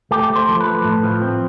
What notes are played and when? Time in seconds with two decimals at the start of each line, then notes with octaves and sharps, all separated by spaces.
0.11 A3 G4
0.30 A3
0.36 C5
0.49 F3
0.60 B4
0.66 A3
0.84 A2
1.03 F3
1.22 C4